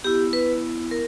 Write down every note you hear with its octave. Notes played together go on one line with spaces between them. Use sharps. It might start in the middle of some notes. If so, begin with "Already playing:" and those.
B3 E4 G4
B4
A#4